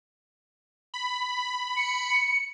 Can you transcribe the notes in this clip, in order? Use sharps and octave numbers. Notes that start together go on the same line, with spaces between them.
B5
C#7